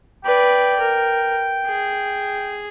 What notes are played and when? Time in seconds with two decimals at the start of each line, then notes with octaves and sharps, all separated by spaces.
0.25 B4 D5 G5
0.80 A#4
1.67 G#4